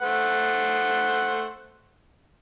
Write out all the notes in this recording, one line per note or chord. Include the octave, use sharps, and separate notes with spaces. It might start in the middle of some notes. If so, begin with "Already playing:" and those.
A3 C5 F#5